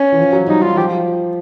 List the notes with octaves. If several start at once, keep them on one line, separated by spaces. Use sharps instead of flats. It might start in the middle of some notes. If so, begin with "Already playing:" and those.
Already playing: C#4
E3
F3
F#3
G3 D#4
F#3 F4
F3 G4